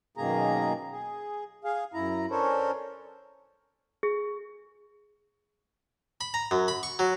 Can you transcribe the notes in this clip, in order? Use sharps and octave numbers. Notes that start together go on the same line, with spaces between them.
F#2 B2 D#3 A#3 G#4 A#5
G#4
G#4 F5
F#2 E4 A#5
C#4 D4 A4 A#4 C5 C#5
G#4
B5
A#5
F#2
B5
C#6
F#3